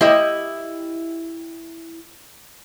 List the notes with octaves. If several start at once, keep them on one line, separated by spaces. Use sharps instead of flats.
E4 G4 D#5